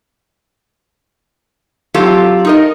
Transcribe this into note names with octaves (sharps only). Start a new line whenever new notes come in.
F#3 C4 F4 G4 A4
D#4 A#4 D#5